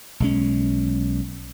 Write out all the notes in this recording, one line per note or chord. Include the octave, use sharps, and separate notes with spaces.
B1 G#3 C#4